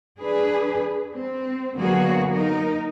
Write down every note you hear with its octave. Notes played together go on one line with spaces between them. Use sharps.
D4 G#4 B4
C4
D3 F#3 A#3 B3 F#4 G#4
D#4 A#4